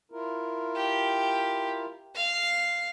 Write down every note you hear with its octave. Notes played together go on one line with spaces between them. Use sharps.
E4 F4 A#4
G4
F5